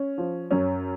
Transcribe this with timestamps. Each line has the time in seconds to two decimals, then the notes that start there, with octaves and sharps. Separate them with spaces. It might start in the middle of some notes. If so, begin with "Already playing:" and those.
Already playing: C#4
0.18 F3
0.51 F#2 C#4